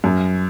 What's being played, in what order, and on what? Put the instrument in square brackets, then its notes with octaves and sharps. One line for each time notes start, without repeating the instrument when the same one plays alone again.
[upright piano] F#2